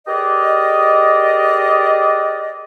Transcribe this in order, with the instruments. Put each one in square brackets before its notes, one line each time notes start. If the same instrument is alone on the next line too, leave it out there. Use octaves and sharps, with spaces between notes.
[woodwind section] G4 G#4 A#4 B4 D5 D#5